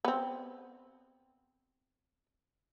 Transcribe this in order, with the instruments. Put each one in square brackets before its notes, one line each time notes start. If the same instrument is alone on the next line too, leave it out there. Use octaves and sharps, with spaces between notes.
[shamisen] B3 C4